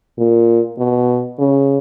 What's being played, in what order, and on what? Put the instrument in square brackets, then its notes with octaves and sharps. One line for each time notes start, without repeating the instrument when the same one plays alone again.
[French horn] A#2
B2
C#3